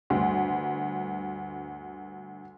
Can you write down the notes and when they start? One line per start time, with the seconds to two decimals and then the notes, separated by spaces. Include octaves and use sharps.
0.10 G1 D2